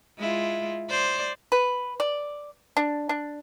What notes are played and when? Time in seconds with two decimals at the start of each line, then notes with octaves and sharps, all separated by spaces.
0.18 G#3 E4 F4
0.90 C5 D5
1.52 B4
2.00 D5
2.77 D4
3.09 D4